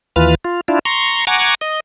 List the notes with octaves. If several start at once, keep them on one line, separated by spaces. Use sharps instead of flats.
D#2 E3 F4 B4 F6
F4
D4 E4 F4
A#5 C6 C#6
F#5 G#5 A#5 C#6 D6
D#5